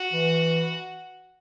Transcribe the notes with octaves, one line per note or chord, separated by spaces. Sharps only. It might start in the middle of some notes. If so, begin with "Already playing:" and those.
Already playing: F#4
E3